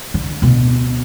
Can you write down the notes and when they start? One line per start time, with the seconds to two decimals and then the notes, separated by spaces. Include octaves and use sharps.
0.14 D3
0.42 D1 B2